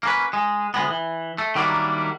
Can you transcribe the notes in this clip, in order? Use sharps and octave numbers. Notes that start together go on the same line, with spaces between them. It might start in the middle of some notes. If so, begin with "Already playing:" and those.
A#3 C#4 B4
G#3
D2 G#3 B3
E3
A3
D#3 F#3 G3 A#3 D4 E4